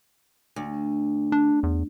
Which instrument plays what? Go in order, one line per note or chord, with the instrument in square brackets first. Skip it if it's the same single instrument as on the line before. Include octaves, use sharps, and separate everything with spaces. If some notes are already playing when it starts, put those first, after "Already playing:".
[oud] D2
[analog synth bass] D4
E2